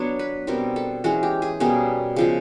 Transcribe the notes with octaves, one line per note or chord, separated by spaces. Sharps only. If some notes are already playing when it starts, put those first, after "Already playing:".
Already playing: F#3 B3 D4 C#5
B4
B2 G3 C4 A#4
A4
E3 G#3 C#4 F#4
G4
G#4
B2 G3 A#3 C#4 G#4
C#3 F3 G#3